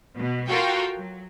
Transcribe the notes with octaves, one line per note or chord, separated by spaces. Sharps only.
B2
F4 F#4 A4 A#4 F5 G5
F#3